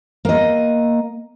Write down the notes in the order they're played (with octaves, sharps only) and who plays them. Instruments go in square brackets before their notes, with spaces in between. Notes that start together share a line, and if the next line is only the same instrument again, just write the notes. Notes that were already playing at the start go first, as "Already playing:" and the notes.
[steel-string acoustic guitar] A#3 D#5